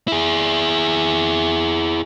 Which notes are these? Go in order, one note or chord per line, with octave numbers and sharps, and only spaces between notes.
E4 G#4